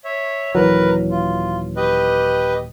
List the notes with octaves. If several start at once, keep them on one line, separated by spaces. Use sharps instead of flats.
C#5 E5
D#1 E3 F#3 A#4 B4
F4
G4 B4 D#5